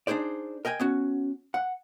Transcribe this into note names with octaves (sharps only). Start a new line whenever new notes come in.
D4 D#4 G#4 C5 D5
A#4 D#5 G5 G#5
B3 C#4 F#4
F#5